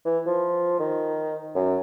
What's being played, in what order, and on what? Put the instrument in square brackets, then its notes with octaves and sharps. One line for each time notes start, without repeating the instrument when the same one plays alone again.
[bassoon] E3
F3
D#3
F#2